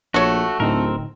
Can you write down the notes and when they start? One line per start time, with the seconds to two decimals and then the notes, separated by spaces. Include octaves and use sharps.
0.14 A#1 A3 F#4 C#5
0.60 D1 A2 D3 C4 D#4 A#4